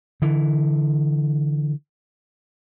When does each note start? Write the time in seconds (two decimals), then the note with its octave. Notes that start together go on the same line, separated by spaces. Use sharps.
0.22 D3 E3